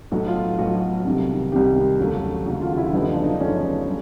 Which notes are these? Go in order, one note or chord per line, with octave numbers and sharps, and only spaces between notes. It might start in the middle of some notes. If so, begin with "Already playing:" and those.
B1 A2 F#3 A3 F#4
F4
B1 A2 F#3 A3 F#4
C2 C3 D#3
C2 C3 D#3 G4
D#2 C#3 F#3 A3
D#2 C#3 F#3 A3 F#4
F4
F4
E4
G1 F#2 C#3 F3 A3 D#4
D4
D#4
G1 F#2 C#3 F3 A3 C#4
G3